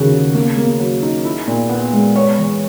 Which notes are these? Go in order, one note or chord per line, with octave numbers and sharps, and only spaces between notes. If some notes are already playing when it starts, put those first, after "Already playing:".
Already playing: D#2 C#3 F#4 G#4
C#3
A#3
A#3
F#3
D#4
E4
A#2
B3
G#3
B3 C#5
E2